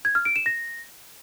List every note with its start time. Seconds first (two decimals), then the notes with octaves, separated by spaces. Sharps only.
0.05 G#6
0.15 F6
0.25 D7
0.36 E7
0.46 A#6